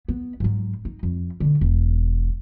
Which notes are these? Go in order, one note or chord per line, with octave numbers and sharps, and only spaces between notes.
B3
G#2 F#3
D#4
F2
B2 D3
E1